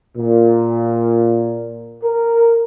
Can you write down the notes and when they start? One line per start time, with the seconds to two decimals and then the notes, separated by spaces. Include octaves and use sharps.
0.18 A#2
2.03 A#4